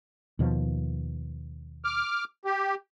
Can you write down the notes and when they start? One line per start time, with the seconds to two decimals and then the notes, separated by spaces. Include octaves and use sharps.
0.39 D#2 B2 F3
1.85 D6 F6
2.45 G4